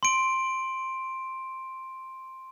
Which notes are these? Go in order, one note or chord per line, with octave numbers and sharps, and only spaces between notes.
C6 D7